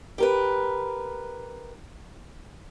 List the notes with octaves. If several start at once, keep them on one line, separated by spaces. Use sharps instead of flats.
G4 A#4 B4